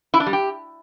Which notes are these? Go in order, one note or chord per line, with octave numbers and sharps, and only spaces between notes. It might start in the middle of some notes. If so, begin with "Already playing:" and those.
E4
D4
G3
G4